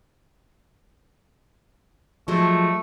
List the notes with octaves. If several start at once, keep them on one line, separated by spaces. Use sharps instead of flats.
F3 F#3 G#3 A3